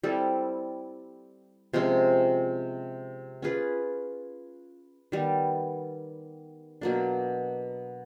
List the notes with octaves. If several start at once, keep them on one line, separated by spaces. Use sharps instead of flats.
G3 C4 E4 A4
C3 F3 G#3 C#4
C#4 F4 G#4 B4
D#3 G3 B3
B2 F#3 A#3 D4